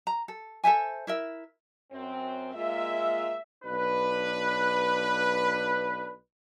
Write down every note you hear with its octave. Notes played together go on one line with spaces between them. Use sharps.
A#5
A4
A4 C5 E5 G#5
E4 A#4 E5
F#2 C4
G#3 A#3 F4 E5
B1 D4 B4